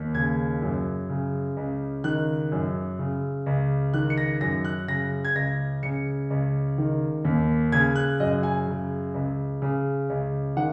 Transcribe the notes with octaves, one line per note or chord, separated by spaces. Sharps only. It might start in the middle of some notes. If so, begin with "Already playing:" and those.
Already playing: D#2
C#3 G#6
F#2
C#3
C#2
D#3 F#6
F#2
C#3
C#2
D#3 F#6
C#7
A#6
F#2 A#6
F#6
C#3 A#6
G#6
C#2 A#6
C#3 C#7
C#2
D#3
D#2
C#3 G#6
F#6
F#2 D#5
G#5
C#3
C#2
C#3
C#2
D#3 F#5